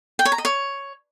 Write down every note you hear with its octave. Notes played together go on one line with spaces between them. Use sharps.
G5
C#5
A#5
D#5
C#5